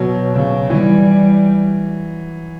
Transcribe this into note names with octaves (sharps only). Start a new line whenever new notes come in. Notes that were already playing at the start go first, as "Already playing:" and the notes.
Already playing: B2 F#3
C#3
E3 G3